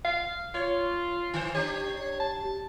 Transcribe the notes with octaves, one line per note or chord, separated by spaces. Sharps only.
F5
F4 C#5
D#3 C5
D4 G4 C#5
A5